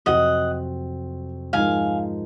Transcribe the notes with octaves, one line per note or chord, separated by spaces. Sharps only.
F2 C3 F#3 C4 F#4 D#5 F#5
G#2 F3 G#3 D#4 A#4 F5 G#5